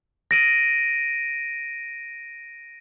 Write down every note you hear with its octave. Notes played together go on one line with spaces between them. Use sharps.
A#6 D7 D#7